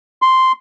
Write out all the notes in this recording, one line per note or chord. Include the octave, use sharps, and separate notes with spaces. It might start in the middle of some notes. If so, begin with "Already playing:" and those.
C6